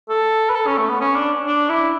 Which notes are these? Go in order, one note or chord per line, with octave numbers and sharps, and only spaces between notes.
A4
B4
A4
C#4
A3
B3
C#4
D4
D4
E4